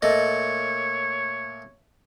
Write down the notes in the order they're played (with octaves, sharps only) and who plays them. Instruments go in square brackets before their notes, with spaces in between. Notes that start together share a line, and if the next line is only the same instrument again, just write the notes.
[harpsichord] A#2 A3 [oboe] C#5 [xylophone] D#5